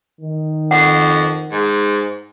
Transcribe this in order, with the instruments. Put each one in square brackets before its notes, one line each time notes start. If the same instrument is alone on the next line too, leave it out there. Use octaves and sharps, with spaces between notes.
[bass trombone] D#3
[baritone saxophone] F2 [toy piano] F#5
[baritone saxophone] G#2